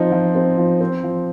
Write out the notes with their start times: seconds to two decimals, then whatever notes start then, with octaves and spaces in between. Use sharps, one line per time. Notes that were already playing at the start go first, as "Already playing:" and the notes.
Already playing: F3 C4 D#4
0.12 F3
0.35 C4
0.58 F3
0.81 C4
1.04 F3